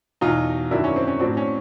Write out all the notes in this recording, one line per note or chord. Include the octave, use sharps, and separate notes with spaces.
E2 B2 F#3 D#4 F4
F#2 D#3 F#3 D4 E4
C#4
C4
C#4
A2 F#3 C4 D4
C#4